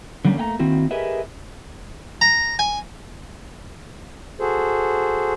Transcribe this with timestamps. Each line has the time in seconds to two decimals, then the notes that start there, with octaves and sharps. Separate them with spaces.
0.25 D3 F#3 G3 A#3 C4 C#4
0.37 A3 A#3 G5 A#5
0.59 D#3 A#3 C4 E4 F#4
0.91 G4 G#4 A#4 B4 D#5 E5
2.21 A#5
2.59 G#5
4.40 F#4 G#4 A4 C5